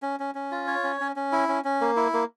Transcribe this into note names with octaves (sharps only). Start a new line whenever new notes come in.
C#4
C#4
C#4
F4
C#5
C#4
C#4
C#4
E4
C#4
C#4
A#3
E4
A#3